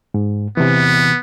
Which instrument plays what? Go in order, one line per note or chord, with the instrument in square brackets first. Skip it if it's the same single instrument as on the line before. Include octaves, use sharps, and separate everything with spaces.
[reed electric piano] G#2
[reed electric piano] C3 E3 [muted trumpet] B3